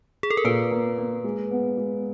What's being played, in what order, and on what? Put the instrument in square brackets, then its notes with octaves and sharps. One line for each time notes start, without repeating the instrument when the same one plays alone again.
[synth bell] G#4
A4
A#4
[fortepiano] A#2 [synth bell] B4
[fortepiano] A#3
A#3
G#3
B3
G#3